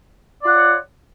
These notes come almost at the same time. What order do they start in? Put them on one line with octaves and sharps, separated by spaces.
D5 F4 F#5 C#5